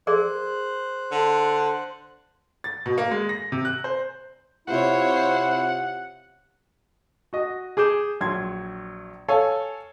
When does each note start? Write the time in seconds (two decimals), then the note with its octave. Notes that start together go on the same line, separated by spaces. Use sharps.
0.07 G#4 A#4 C5 D5 F#6
1.11 D3
2.64 A6
2.86 B2
2.98 A#3
3.11 G#3
3.29 A#6
3.52 C3
3.65 F#6
3.84 C5
4.68 C3 E4 F4 C5 C#5 F#5
7.33 F#4 D#5
7.77 G#4 D6 G6 E7
8.21 A#1 F#3 C6 G#6
9.28 A4 C#5 F5 G#5